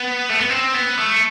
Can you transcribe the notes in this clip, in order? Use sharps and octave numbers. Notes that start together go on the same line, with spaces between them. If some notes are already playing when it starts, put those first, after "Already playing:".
Already playing: B3
A3
B3
C4
B3
A3